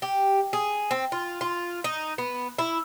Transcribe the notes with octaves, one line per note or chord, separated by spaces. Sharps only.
G4
G#4
C4
F4
F4
D#4
B3
E4